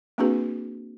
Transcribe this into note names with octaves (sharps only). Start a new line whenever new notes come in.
A#3 C4 D4 F#4 G#4 B4